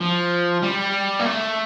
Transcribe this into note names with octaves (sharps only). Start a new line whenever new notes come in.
F3
G3
A#3
A3